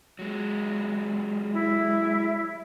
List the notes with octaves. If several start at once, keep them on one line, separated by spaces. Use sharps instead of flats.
F#3 G#3
E4 E5